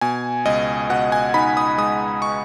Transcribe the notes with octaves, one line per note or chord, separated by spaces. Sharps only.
B2 G#5
C#2 D#5
B2 F#5
G#5
D#4 B5
D#6
G#3 D#6
C#6